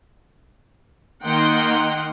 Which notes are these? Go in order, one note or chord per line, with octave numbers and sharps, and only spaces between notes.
D#3 A#3 D#5 F#5 G5 C6